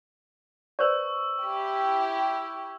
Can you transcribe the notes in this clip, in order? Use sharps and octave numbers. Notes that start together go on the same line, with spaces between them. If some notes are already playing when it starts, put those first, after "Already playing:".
B4 C5 D5 C#6 E6
E4 G4